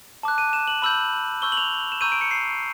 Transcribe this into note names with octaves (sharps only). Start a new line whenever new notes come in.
A5 D6 F#6
D#7
E7
F#7
B5 E6 G6 F#7
C#6 E6 G6 G7
F#7
F7
E7
A#5 C#6 E6 G6 D#7
D7
C#7
C7